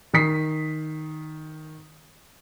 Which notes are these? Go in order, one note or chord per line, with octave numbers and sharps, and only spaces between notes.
D#3 D#6 B6 C7